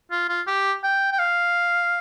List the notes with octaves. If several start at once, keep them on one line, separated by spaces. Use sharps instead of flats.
F4
F4
G4
G5
G5
F5